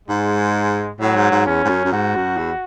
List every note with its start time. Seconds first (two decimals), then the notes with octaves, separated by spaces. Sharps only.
0.08 G#2 G#3
1.00 A2 F#3
1.16 G#2
1.31 G#2
1.46 E2 C#4
1.64 G#2
1.69 F#2
1.85 F#2
1.92 G#2 F#4
2.15 F#2
2.37 E2